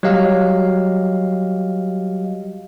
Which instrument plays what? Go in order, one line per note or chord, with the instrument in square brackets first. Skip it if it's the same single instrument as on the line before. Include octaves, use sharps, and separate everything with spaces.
[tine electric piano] F#3 G3 G4 D#5 F5